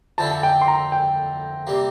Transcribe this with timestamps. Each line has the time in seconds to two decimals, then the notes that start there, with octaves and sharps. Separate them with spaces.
0.18 F2 D3 F3 C4 E4 A5
0.31 A5
0.43 G5
0.61 C6
0.68 A#5
0.92 G5
1.67 C3 G3 A#3